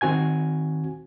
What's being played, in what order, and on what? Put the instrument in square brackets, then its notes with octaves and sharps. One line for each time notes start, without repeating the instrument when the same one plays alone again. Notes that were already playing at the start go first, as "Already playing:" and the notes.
[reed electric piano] D#3 C4 F#4 G#5 G#6